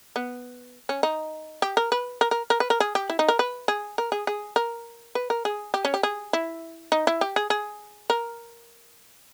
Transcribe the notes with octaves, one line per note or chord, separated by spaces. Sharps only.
B3
C#4
D#4
G4
A#4
B4
A#4
A#4
A#4
B4
A#4
G#4
G4
E4
D#4
A#4
B4
G#4
A#4
G#4
G#4
A#4
B4
A#4
G#4
G4
C#4
G4
G#4
E4
D#4
E4
G4
G#4
G#4
A#4